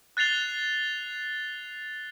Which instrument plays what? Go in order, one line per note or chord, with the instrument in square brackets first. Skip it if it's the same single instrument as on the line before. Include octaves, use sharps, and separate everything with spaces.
[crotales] F#6 A6 C7 F7 G7